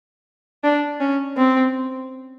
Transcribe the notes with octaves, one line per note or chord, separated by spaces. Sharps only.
D4
C#4
C4